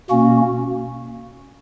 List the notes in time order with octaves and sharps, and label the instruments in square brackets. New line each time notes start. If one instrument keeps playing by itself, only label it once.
[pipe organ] B2 A#3 C#4 F#4